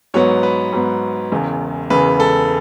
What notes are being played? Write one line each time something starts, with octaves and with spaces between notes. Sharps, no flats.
G#2 F#3 B3 C#5
B4
G#2 F#3 B3
E1 E2 C#3
E1 E2 C#3 B4
A4